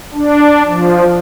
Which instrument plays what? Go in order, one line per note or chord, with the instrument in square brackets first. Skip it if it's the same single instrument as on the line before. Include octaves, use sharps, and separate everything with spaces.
[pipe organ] D4
F3